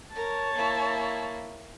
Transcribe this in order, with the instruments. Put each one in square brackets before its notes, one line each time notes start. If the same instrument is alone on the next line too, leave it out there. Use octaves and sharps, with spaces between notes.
[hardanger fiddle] A#4 [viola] C#5 A5
[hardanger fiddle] A#3 E4